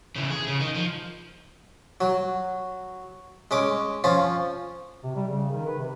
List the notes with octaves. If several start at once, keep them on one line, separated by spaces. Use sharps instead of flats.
C#3 E3
G#4
C#3
D#3 D#4
F3
F#3
G#3 C#4 D6
F3 C#4 F4
C3
G3
C#3
D#3
B4
C3